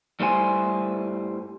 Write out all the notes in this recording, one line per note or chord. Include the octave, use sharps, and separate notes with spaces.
G2 G3 A3 E4 C5 G#5